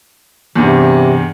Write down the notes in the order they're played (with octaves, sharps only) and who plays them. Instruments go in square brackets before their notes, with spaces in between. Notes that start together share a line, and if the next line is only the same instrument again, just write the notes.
[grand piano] E2 G2 [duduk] C3